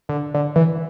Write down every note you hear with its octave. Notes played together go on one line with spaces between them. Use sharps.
D3
D3
E3